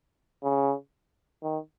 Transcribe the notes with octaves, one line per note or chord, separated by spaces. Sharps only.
C#3
D#3